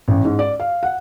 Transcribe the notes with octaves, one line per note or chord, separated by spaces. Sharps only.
A1
G#2
D5
F5
F#5